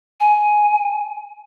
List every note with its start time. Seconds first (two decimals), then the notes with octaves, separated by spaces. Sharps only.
0.20 G#5